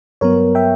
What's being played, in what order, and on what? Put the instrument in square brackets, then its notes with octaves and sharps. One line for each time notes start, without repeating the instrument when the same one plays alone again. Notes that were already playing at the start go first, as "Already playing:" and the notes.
[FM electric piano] G2 F#3 B3 A#4 C#5
E5 G5